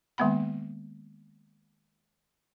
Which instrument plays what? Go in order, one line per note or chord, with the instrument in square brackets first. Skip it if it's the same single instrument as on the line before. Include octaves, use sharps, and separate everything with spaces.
[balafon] D#3 G#3 A#3 B3 F#5 B5